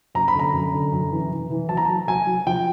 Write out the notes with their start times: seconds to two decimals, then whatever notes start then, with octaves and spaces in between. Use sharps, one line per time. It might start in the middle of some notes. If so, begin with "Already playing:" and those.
0.15 F#2 A#5
0.28 B5
0.34 D3 A#5
0.53 F#2
0.73 D3
0.92 F#2
1.11 E3
1.31 E3
1.50 E3
1.69 F#3 A5
1.77 A#5
1.85 F#3 A5
2.08 F#3 G#5
2.27 F#3
2.47 F3 G5